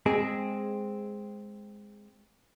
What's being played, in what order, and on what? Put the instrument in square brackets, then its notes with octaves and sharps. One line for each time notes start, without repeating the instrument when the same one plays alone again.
[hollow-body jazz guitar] G#3 C4 G#4